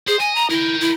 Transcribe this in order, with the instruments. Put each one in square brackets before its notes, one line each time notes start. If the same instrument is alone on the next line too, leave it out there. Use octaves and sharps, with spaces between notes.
[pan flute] G#4 [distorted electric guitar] C5
[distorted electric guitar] D#5 [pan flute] G#5
[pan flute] A#5
[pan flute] E4 [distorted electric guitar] A#4 G5
[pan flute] E4